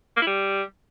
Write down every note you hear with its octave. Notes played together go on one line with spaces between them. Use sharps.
A#3
E4
G3